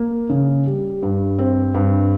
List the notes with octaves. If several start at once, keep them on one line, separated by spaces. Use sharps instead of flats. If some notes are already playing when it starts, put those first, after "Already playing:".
Already playing: A#3
C#3
G3
G2
C4
G2